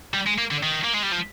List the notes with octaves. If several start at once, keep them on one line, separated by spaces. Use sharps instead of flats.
G3
G#3
A#3
D3
D#3
A#3
G#3
G3
F3